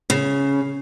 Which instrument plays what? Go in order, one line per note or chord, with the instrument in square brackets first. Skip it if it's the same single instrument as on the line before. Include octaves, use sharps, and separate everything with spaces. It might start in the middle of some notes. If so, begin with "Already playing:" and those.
[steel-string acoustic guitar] C#3